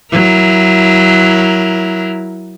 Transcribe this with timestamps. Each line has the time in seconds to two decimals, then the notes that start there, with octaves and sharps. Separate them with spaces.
0.12 F#3 E4 A#4